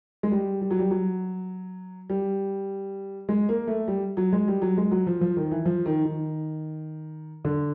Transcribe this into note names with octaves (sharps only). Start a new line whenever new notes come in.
G#3
G3
G3
F#3
G3
F#3
G3
G#3
A#3
A3
G3
F#3
G#3
G3
F#3
G#3
F#3
F3
F3
D#3
E3
F3
D#3
D#3
D3